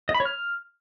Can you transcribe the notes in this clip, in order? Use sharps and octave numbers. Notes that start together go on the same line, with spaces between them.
D#5
B5
C#5
F6